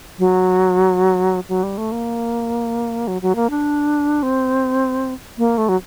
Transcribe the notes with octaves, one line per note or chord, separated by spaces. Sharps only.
F#3
F#3
G3
A3
A#3
F#3
F#3
A#3
D4
C4
A#3
A3
F#3